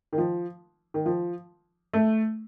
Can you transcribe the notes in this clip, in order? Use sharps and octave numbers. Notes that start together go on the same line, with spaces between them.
D#3
F3
D#3
F3
A3